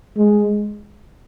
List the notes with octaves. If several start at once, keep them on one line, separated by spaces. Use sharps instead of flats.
G#3